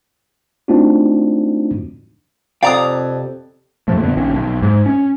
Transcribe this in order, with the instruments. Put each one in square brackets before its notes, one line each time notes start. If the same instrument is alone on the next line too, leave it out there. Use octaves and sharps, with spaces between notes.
[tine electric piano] A3 C4 D4 D#4 F4 F#4
[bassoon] F2 [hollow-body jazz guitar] C3 D5 G5 [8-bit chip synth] F5 A#5 D#6
[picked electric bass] F2 A#2 F3 A3
D3 B3
A#1 D#3 C#4
B1
G#2
C#4